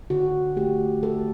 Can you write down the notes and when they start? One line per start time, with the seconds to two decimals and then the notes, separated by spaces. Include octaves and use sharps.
0.10 D3 F#4
0.56 A3 G4
1.03 A3 A4